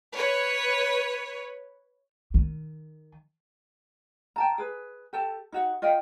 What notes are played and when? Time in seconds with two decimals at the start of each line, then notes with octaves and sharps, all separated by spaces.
0.15 B4 C#5
2.34 D#3
4.36 G5 A5 A#5
4.58 G#4 B4
5.13 G4 A4 A5
5.52 D#4 F#4 F#5
5.82 F4 D#5 F5 G5